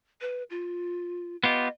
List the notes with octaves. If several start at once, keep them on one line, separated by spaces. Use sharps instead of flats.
B4
F4
B3 F4 G4 D#5